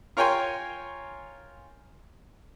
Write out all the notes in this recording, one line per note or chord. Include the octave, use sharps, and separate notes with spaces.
F4 A#4 C#5 G5 G#5 C6